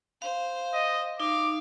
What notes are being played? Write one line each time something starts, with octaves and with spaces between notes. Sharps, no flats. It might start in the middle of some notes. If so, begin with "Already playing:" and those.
C5 F5
D#5
D#4 F5 D6